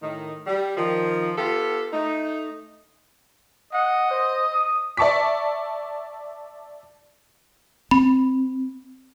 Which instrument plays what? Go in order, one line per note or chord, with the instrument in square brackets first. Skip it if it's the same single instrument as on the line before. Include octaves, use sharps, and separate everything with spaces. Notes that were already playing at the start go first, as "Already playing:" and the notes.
[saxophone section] A2 D#3
G3
D#3 F3
B3 F4 G4 A4
A3 D#4
[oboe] D#5 [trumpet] F#5
[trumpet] C5
D#6
[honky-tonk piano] D5 E5 A5 C#6 D6 B6
[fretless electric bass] C4 [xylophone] B5